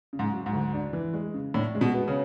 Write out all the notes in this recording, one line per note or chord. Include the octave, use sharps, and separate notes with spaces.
C#3
G#2
F#3
G#2
D2
D4
E3
G#3
C#3
A2 D4
G#3
B2
B3
C#3